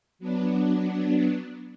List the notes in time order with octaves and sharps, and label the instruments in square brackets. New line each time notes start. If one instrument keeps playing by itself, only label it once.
[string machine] F#3 B3 D4